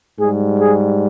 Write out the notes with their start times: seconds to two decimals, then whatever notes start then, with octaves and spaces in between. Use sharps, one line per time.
0.19 G#2 G3 G#4
0.61 G#4